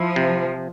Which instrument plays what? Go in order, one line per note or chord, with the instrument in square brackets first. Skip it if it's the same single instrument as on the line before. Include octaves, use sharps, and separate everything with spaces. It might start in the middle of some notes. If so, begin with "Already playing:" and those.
Already playing: [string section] F3 [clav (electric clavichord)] E4
[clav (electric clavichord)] C3